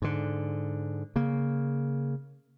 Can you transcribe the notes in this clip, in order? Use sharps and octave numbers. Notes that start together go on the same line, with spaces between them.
G#2 D3
C#3 A#3